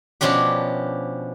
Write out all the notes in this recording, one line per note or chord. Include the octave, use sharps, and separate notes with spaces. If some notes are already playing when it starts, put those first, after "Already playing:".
B2 F3 C#4 D4 G4